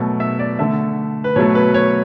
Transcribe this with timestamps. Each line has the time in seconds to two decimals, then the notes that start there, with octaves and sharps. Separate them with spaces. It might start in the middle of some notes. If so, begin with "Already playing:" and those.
Already playing: B2 F#3 A3
0.20 E5
0.39 D5
0.59 D3 A3 E5
1.24 B4
1.36 B2 F#3 A3 C#5
1.55 B4
1.74 C#5